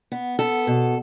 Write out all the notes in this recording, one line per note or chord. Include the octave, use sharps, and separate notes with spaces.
B3
B3 A4
B2